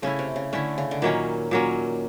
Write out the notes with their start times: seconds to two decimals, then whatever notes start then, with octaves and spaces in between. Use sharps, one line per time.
0.02 C#3 A3 C#4 E4
0.19 C3
0.36 C#3
0.53 D3 A3 C#4 E4
0.78 C#3
0.91 D3
1.02 A#2 D#3 F#3 A#3 C#4
1.51 A#2 F#3 A#3 C#4